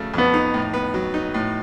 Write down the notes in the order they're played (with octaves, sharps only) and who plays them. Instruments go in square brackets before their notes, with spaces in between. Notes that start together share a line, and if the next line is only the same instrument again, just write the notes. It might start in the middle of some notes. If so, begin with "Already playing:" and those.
Already playing: [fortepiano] F2 C#3 F#3 A3
[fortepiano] F2 [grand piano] B3
[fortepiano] D#4
A2
B3
F#3
D#4
A2